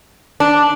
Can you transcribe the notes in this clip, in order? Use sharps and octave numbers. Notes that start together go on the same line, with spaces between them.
D4